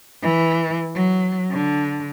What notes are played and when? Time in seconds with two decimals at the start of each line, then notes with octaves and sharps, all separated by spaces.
0.23 E3
0.95 F#3
1.51 D3